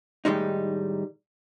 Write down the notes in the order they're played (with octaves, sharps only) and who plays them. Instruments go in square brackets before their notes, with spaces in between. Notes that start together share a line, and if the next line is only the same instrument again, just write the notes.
[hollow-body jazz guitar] A2 D#3 G3 G#3 D#4